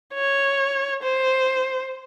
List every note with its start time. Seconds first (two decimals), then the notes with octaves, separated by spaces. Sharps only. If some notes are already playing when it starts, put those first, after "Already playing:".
0.14 C#5
1.03 C5